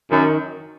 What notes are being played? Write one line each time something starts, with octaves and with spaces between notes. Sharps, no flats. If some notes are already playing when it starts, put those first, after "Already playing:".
F#2 D#3